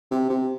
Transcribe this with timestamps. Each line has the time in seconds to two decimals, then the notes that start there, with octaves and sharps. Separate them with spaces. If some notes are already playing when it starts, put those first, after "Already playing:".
0.11 C3
0.30 C3